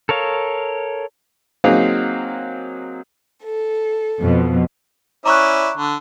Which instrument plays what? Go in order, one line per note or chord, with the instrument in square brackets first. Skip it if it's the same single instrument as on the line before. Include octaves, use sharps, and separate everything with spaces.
[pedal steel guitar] A4 A#4 C#5 F5
[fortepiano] F#3 A#3 C4 D#4 G#4 F5
[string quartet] A4
[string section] F2 B2
[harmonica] C#4 E4 D5 [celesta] A#5 C#6 F#6
[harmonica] D3